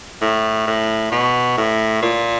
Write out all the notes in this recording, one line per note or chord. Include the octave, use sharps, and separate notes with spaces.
A2
A2
B2
A2
A#2